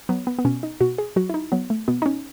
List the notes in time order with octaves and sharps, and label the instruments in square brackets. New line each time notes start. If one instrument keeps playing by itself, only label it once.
[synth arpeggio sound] F#3 B3
B3
B3
B2 C#4
D#4
B2 F#4
G#4
F#3 F#4
E4
D#4
F#3 B3
A3
B2 B3
D#4
C#4